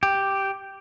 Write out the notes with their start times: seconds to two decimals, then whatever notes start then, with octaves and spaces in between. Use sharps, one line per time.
0.03 G4